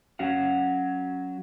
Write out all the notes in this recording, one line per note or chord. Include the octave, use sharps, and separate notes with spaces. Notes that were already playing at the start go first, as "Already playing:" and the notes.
F#3 C#4 F#4 F5 F#5